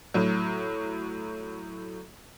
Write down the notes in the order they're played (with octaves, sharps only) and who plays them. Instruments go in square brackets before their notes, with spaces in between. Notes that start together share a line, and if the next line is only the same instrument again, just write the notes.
[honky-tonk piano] A2 F#3